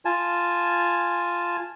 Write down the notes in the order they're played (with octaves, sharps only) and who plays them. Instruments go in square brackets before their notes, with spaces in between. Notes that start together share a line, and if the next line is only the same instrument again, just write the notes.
[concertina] F4 G#5 A5